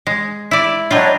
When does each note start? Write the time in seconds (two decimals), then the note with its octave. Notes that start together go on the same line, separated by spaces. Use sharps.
0.07 G#3
0.51 E4 D5
0.91 F#3 G3 D4 F4 C#5 D#5